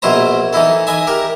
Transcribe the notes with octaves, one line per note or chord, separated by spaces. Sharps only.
A#1 B2 E4 C5 A#5
E3 D#4 E4 A4
B4 D#5 E5 G#5
G4 A#4